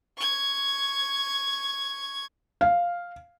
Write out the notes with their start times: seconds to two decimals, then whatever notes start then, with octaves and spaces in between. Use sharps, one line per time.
0.17 C#6 G#6
2.61 F5